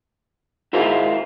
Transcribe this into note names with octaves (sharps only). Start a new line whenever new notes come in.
G#2 E4 F4 A#4